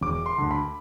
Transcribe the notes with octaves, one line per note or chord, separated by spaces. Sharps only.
E1 D6
C6
D2 D3
B5